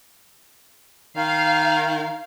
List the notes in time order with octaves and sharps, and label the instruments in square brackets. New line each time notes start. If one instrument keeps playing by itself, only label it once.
[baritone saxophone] D#3 [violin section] F5